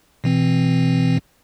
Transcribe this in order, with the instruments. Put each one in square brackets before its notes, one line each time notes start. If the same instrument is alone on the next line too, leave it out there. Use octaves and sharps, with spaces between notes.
[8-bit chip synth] B2 E3 C4